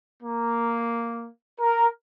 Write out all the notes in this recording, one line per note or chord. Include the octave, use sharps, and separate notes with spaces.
A#3
A#4